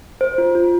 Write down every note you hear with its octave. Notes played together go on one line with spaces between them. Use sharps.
C5
F4
F4